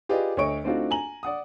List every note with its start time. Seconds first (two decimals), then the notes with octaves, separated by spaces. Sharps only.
0.09 F4 G4 G#4 B4 D5 D#5
0.37 D2 A3 C#5 D#5 C#6 D7
0.64 A3 C4 D4 D#4 F4 F#4
0.91 G#5 A#5 F#7
1.23 D5 F#5 D#6